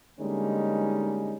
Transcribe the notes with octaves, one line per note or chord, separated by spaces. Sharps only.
D3 G3 G#3 A#3 C#4 D#4